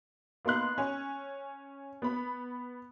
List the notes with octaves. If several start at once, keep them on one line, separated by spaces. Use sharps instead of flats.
A#3 B3 D#4 C6 F#6
C#4
B3 B5